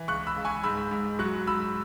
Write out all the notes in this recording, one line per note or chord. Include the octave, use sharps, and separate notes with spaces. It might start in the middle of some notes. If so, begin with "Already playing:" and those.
Already playing: E3
C#2 C#6 F#6
B5 E6
C#2
G#5 C#6
G#2 B5 E6
G#2
F#3 C#6 F#6
G#2 B5 E6